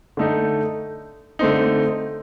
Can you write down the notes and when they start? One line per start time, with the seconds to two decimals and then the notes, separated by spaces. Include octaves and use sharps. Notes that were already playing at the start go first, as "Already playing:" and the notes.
0.17 D3 A3 D#4
1.39 D3 A3 C4 D#4